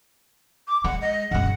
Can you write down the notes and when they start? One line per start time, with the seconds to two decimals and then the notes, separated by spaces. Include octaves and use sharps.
0.68 D6
0.84 G#3 F#5
1.02 D#5
1.31 F#2 C#3 F#5